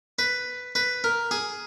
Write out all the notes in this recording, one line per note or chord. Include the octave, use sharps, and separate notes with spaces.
B4
B4
A#4
G#4